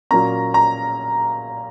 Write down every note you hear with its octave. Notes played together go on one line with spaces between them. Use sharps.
A#2 F#3 A#3 C#4 A#5
A#5